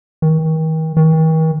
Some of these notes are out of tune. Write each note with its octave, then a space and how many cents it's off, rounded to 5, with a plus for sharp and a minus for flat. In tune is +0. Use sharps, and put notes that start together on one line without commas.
D#3 +40
D#3 +45